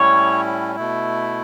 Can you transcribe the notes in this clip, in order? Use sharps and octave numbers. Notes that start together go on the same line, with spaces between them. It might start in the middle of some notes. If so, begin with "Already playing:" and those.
Already playing: A2 G3 C#4 E4 C#5
B2 A3 E4